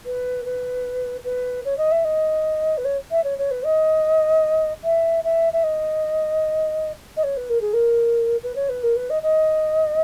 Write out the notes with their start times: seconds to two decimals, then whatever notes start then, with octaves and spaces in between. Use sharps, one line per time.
0.06 B4
0.45 B4
1.24 B4
1.65 C#5
1.77 D#5
1.91 E5
2.04 D#5
2.77 B4
2.84 C#5
3.11 E5
3.23 C#5
3.38 C#5
3.51 B4
3.64 D#5
4.84 E5
5.24 E5
5.53 E5
5.63 D#5
7.16 D#5
7.23 C#5
7.36 B4
7.49 A#4
7.61 G#4
7.73 A#4
8.43 B4
8.55 C#5
8.69 B4
8.83 A#4
8.96 B4
9.09 D#5
9.22 D#5